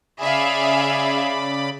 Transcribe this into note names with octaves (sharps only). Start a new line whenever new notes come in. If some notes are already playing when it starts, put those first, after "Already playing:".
C#3 G#4 D5 E5 F5 B5